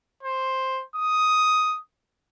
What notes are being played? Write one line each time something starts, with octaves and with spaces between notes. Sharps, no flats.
C5
D#6